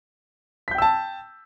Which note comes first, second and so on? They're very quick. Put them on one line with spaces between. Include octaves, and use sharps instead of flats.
B6 G6 G5 E6 A5